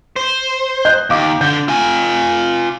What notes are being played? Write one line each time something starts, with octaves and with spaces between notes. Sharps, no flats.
C5
D#5 F#6 G6
D#2 F5 D6
D3 G6 G7
F4 G#5